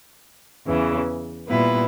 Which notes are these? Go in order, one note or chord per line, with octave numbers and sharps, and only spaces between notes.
E2 C#3 E3
A#2 G3 B3 E4 B4